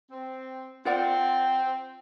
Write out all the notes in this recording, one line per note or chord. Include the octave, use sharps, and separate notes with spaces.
C4
C4 F4 D5 F#5